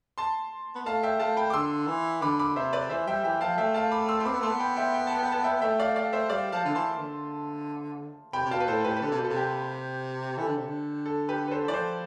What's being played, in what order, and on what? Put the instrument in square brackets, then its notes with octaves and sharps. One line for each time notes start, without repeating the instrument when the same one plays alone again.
[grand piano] A5 C6
[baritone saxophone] B3
[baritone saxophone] A3 [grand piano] F5 A5
[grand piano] E5 G5
[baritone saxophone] A3 [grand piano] F5 A5
[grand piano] G5 B5
D6
[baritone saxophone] D3 [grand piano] C6 E6
[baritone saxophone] E3
[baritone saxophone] D3 [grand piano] B5 D6
[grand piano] B5 D6
[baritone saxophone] C3 [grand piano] C5 E5
[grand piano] B4 D5
[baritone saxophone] E3 [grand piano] C5 E5
[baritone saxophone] G3 [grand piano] E5 G5
[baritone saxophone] E3 [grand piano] E5 G5
[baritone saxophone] F3 [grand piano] F5 A5
[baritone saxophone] A3 [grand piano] E5 G5
[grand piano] F5 A5
B5 D6
C6 E6
C6
[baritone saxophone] C4 [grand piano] B5 D6
[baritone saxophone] B3
[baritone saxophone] A3 [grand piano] A5 C6
[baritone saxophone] B3
[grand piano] G5 B5
E5 G5
G5
A5
G5
A5
E5 G5
[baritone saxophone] A3 [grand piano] E5 G5
[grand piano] D5 F5
D5 F5
C5 E5
[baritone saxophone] G3 [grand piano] D5 F5
[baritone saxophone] F3 [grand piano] F5 A5
[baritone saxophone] D3
[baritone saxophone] E3 [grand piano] A5 C6
[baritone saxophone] D3
[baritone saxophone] C3 [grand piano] G5 B5
[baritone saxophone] C3
[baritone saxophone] B2 [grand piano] F5 A5
[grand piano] B4
[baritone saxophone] A2 [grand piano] A4 C5
[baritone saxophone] A2 [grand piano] G4 B4
[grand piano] B4
[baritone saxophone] D3 [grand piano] A4
[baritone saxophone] C3
B2
[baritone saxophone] C3 [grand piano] A4
[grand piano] G4
[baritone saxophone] E3 [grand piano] A4
[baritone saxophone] D3
C3
D3
[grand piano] A4
G4 B4
B4
A4 C5
[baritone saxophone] E3 [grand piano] D5
[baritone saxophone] F3 [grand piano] A4 C5